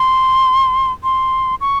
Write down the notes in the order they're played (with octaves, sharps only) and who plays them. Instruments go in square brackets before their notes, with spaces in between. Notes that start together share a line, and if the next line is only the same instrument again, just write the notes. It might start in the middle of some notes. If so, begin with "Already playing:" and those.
Already playing: [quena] C6
C6
C#6